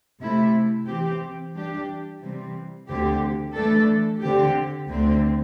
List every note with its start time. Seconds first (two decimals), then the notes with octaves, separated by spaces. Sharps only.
0.21 C3 A3 E4
0.87 E3 C4 G4
1.54 E3 G3 D4 G4
2.21 C3 E3 G3 C4
2.88 D2 D3 C4 G4
3.54 E3 A3 D4 A4
4.20 D3 C4 G4
4.87 D2 D3 C4